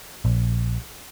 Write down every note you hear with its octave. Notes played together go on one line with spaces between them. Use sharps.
A#1